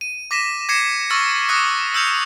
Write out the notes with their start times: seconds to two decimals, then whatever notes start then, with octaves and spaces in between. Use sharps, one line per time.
0.01 D#7
0.31 D6 A#6 B6 D#7 E7
0.69 D6 G#6 A#6 C7 C#7 E7
1.10 C#6 E6 F6 A6 A#6
1.48 D6 D#6 F6 F#6 A#6 C#7
1.94 E6 F6 G6 C#7 F7